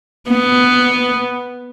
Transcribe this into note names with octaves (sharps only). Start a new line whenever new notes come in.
B3